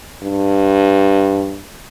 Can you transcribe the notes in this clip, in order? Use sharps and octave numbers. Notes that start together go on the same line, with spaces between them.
G2